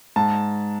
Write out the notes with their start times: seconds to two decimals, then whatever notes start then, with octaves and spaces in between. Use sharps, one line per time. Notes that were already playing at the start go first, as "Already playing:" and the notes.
0.16 G#2 A5